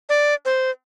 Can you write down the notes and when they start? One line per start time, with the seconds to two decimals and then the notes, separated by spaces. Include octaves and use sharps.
0.09 D5
0.45 C5